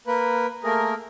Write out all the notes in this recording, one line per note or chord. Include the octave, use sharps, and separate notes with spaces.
A#3 B4
A3 A#3 G#4 A#4